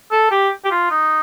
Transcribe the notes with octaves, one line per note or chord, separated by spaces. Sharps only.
A4
G4
G4
F4
D#4